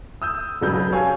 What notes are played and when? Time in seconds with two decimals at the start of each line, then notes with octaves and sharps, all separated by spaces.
0.22 D#6 E6 G6
0.61 E1 B1 C#3 F#3 B4 G6
0.92 G4 A4 C#5 F5 G#5